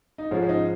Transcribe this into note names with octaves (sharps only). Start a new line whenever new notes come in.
D#4
G#2 F3 G#3 C#4
C#4
D#4